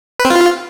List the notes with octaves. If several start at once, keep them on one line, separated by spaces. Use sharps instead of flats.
B4
C4
F4